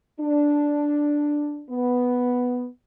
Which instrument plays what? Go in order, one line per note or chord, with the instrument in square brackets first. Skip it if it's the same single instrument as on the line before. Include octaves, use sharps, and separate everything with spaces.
[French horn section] D4
B3